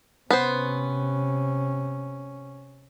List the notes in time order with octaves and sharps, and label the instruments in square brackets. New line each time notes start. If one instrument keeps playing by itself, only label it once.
[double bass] C3 C#4 [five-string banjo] B3 C5